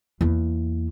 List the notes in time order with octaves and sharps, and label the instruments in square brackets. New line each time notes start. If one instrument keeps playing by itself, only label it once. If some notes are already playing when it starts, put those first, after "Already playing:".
[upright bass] E2 A#3